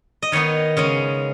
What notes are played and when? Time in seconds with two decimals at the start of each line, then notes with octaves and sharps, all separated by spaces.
0.22 D#5
0.32 D#3 B3 D#4 C#5
0.77 C#3 G#3 C#4